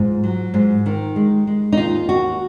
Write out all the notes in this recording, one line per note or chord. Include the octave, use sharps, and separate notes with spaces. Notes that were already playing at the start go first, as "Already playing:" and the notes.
Already playing: G#2 F4
F#3
G#2
D#3
G#3
G#3
D#4
D#2 F4
D#2 F#4